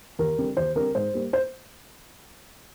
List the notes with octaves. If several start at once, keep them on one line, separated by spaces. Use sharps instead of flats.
D#2 A#4
D3 G3 C4
D#2 C5
D3 G3 C4 A#4
G#2 C5
G3 A#3
C5